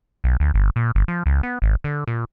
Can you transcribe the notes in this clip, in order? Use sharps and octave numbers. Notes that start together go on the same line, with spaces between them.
B1
D2
G1
A#2
G1
F3
C#2
B3
G#1
D3
A#2